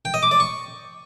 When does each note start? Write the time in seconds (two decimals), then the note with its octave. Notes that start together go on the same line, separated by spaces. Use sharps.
0.05 G5
0.14 D#5
0.23 D6
0.31 D5
0.40 C#6